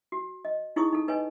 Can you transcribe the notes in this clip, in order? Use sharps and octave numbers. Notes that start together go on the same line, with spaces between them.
F#4
D#5
D#4 E4 G#4 C#5 C#6 D#6
D#4 A4
D#4 B4 C#5 D#5 G#5